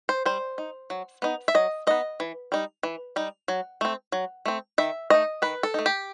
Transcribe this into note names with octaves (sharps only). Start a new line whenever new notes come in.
C5
G3 C5
D#4
F#3
B3 D#4
E5
F#3 D#5
B3 D#4 D#5
E3
G3 D#4
E3
G3 D#4
F#3
A3 C4
F#3
A3 C4
D#3 E5
A3 D#4 D#5
D#3 B4
A4
A3 D#4
G4